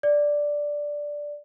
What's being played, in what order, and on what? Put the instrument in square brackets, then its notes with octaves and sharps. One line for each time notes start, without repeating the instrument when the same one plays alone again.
[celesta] D5